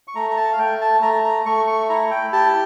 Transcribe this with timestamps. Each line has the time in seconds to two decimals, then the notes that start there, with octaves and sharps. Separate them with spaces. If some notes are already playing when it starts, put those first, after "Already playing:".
0.08 C#6
0.15 A3 A#5
0.31 A#5
0.37 A5
0.53 F5
0.59 A3 G5
0.81 A5
1.02 A3 A#5
1.24 A#5
1.46 A3 C#6
1.67 C#6
1.89 E4 A#5
2.11 G5
2.33 G4 A5